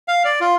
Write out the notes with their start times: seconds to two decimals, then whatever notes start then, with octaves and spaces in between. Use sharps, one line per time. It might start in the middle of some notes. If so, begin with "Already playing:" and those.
0.08 F5
0.25 D5
0.41 F4